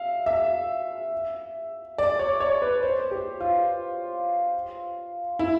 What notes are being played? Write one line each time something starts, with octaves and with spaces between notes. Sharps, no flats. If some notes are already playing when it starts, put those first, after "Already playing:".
Already playing: E5 F5
E5
D5
C#5
C#5
B4
C5
G4
F4
E4